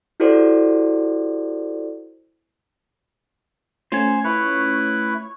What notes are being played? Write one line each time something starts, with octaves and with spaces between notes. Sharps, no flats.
E4 F#4 G4 A4 C5 D5
A3 C#4 F4 C5 G#5
E4 B4 C#5